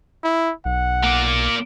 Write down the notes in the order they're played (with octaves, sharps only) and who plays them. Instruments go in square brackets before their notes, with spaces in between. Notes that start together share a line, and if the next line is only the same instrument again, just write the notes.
[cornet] E4
[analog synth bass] B1 [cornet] F#5
[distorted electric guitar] A#3 D5